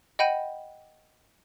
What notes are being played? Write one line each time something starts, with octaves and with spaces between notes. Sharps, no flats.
D#5 F#5 G5 B5 G6 D#7